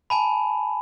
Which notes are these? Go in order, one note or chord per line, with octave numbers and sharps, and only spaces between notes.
G#5 A5 B5